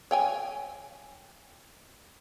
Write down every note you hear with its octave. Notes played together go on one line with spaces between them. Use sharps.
C#5 G5 G#5